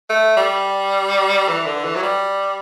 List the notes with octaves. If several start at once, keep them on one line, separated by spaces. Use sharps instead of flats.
A3
G3
E3
D3
E3
F#3
G3